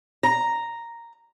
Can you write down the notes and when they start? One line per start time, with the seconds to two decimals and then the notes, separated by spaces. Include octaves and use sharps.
0.23 A#5